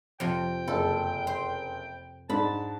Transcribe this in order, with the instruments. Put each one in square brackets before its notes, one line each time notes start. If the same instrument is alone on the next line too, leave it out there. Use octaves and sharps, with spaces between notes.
[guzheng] F2 C3 [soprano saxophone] G5
[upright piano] F#1 [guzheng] A4
[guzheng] C5
[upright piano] G#2 D4 [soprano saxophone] A5 [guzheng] B5